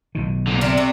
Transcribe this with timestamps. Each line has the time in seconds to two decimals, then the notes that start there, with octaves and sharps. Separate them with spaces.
0.15 B1 B2 D#3
0.47 A#2 D3
0.61 C3 D4 A#4
0.78 A3 D4